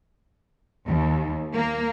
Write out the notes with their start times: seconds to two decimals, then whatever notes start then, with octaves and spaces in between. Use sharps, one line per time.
0.86 D#2
1.55 A#3